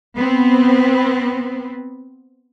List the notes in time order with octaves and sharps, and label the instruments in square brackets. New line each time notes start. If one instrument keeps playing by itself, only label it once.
[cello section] B3 C4